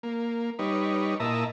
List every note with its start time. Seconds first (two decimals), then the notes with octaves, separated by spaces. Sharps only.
0.03 A#3
0.59 G3 D#4 B4 C#5
1.20 A#2 E4 D#5 E5 A5 A#5